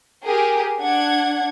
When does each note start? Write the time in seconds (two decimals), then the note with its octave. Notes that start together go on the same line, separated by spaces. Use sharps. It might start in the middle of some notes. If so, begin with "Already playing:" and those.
0.23 G4 G#4 A#4
0.79 D4 F#5 G#6